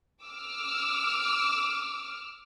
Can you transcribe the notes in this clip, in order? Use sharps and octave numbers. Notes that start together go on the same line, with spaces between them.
D6 E6 F6